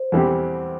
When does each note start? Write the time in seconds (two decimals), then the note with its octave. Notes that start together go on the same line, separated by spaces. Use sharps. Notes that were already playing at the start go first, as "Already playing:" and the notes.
Already playing: C5
0.12 E2 E3 G3 C4 G4